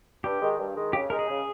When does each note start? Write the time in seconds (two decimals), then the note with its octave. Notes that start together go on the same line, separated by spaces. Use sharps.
0.24 G2 G4
0.41 D#3 G#3
0.58 G2
0.75 D#3 G#3
0.93 C#3 G4
1.10 G#3 D#4 A#4
1.19 G#4
1.28 C#3